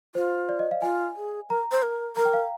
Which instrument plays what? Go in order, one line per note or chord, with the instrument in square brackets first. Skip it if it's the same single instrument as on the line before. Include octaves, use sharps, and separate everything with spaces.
[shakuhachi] F4 [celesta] C5
[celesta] D5
D#5
F5
[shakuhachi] F4 [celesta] G#5
[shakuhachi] G#4
[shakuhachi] A#4 [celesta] A#5
[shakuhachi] C5
A#4
[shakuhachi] A#4 [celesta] A#5
[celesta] G5
F5